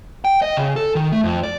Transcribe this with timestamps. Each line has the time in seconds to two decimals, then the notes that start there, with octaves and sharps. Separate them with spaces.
0.25 G5
0.42 D#5
0.57 C#3
0.76 A4
0.95 D#3
1.12 A3
1.24 F2
1.43 D5